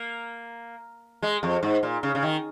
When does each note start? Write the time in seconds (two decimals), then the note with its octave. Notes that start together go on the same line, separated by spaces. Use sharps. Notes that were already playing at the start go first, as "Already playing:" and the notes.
Already playing: A#3
1.22 G#3
1.43 F2
1.63 G#2
1.83 A#2
2.03 C#3
2.15 C#3
2.23 D#3